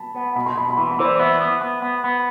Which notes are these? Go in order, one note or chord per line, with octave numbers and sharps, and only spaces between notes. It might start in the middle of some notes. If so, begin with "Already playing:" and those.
Already playing: A5 B5
B3
B2 B5
C6
B2 B5
B5
E3 C6
B5
E3 C5
D5
B3 E5
B3
B3
B3
B3